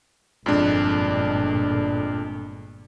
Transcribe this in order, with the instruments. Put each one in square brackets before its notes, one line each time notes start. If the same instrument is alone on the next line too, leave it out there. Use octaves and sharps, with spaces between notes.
[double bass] G1 A#2 [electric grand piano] F2 G#3 D4